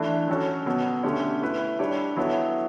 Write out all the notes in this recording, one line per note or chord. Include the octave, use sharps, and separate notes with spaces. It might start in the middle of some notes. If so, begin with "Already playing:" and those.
Already playing: E3 A3 D4
F#3 C#4 F#4 A4 C#5
B2 F#3 B3
D3 A3 C#4 G4 C#5
A3 E4 B4
G3 D4 G4 C#5
F#3 B3 E4 A4 C#5